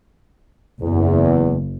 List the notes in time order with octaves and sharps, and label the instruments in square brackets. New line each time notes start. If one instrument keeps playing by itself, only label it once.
[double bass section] F#1 [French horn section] E2